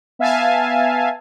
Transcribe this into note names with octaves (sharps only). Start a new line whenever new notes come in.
B3 E5 F5 G#5 A5